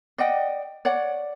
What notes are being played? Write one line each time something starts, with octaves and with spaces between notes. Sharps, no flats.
D5 D#5 F#5 G5
C#5 D5 F#5